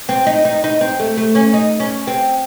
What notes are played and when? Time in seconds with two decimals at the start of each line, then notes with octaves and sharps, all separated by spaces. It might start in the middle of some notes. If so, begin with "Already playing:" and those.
0.09 C4
0.26 D#4
0.45 D#4
0.64 D#4
0.81 C4
1.00 A3
1.17 A3
1.35 C#4
1.54 D#4
1.80 C#4
2.07 C4